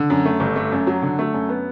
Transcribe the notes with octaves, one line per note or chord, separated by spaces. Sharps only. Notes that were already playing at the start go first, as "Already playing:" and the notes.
Already playing: D3
F#2
A3
G1
A3
F#2
F#3
D3
A3
F#2
B3